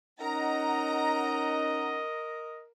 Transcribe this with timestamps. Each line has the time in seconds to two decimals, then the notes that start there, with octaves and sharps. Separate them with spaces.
0.21 C#4 D#4 A#4 D#5 F#5 A#5